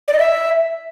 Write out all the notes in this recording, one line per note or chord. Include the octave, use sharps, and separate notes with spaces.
D5
D#5
E5